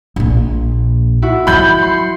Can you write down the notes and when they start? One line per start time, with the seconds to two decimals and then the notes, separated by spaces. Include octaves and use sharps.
0.16 A#1 A#2
1.22 E4 F#4
1.47 F3 F#3 B5 G6
1.78 C6 C#7